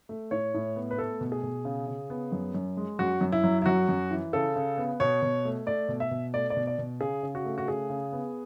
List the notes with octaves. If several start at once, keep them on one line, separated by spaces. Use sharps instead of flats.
A3
A2 C#5
A2
B3
B4
A3 A4
B2
G#4
B2
C#3
C#3
B3
F#2
F#2
G#3
F#2 F#4
F#2
E4
F#3
E4
F#2 F#4
F#2
E3
C#3 A4
C#3
B3
B2 C#5
B2
A3
A3 D5
B2
E5
B2
A3 D5
D5
B2
D5
B2
C#3 G#4
C#3
F#4
A3
F#4
C#3 G#4
C#3
B3